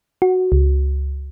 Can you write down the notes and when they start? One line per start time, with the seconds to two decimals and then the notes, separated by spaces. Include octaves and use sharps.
0.22 F#4
0.52 C#2